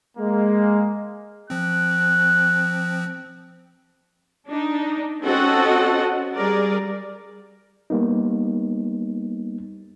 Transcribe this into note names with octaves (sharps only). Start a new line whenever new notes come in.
G#3 A#3
F3 C4 F#6
D4 D#4
C4 C#4 F#4 A4 D#5 F#5
G3 G#4 A#4 D5
G3 A#3 B3 D#4